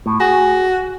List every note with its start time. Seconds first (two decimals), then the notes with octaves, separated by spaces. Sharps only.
0.06 A2
0.20 F#4 G#4